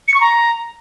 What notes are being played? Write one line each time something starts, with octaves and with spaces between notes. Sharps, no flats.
C#7
C#6
A#5